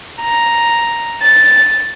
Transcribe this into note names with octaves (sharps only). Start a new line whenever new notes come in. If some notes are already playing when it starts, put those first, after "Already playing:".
A#5
A6